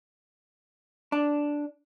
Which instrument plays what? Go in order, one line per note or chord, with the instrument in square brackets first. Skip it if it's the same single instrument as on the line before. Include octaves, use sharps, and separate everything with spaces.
[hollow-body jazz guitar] D4